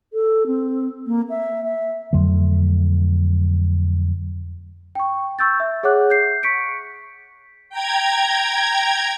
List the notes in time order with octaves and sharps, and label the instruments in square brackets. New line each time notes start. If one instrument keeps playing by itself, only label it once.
[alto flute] A4
C4
A#3
E5
E5
[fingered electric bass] F2 D3 F#3 A3
[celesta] G5 C#6
C#6 E6 G6 A6
E5
G#4 C#5 F#5 D6 F#6
G6 C7
C#6 B6 C#7 D7
[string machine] G5 A#5 G#6